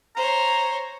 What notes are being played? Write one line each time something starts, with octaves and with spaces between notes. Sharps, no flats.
C5 C#5 A#5